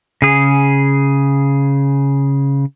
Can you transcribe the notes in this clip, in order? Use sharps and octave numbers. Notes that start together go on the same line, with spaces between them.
C#3 G#4